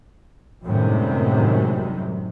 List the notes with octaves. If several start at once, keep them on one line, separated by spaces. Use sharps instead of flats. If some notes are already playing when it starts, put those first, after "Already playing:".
F#2 A2 C3 D#3 G3 G#3